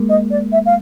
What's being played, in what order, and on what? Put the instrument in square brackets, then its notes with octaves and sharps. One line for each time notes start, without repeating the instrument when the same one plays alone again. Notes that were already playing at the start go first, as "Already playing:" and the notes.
Already playing: [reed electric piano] G#3 A#3
[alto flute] D#5
D5
E5
F5